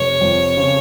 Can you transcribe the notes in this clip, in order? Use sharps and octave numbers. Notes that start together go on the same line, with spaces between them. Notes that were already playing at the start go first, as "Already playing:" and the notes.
Already playing: F1 C#5
F2
C#3